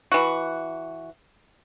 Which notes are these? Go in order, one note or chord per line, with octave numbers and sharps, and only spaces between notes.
E3 F#4